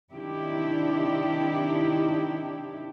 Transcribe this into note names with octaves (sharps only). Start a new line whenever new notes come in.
C3 D#3 D4 E4 G4